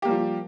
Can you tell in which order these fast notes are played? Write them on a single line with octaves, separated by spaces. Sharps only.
G4 A#3 G3 F3